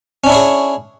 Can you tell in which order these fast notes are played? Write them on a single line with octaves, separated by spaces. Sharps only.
C#4 D4 E4 C#5 G#4